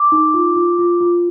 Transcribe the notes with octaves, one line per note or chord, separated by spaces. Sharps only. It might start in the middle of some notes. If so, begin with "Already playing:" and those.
Already playing: D6
D#4
F4
F4
F4
F4